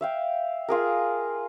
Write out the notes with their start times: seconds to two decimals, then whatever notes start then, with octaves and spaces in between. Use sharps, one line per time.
0.01 E5 F5 G5
0.68 F4 G#4 A#4